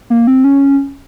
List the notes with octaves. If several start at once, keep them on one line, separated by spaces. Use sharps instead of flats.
A#3
C4
C#4